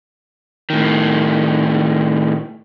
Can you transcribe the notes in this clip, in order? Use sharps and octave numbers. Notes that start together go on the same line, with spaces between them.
A2 D#3